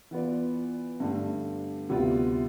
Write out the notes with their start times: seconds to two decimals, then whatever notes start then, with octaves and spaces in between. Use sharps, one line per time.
0.11 E3 B3 F4 B4 D5
1.00 G2 D3 A3
1.89 D2 C3 G3 B3 F4